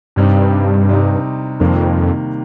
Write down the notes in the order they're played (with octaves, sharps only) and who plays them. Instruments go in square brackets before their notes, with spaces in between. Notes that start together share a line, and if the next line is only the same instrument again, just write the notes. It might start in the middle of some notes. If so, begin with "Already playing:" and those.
[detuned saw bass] G2 [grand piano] C3 G3 C4 D#4
[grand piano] C3 G3 C4 D#4
[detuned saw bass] F2 [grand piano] C3 D#3 G3 A#3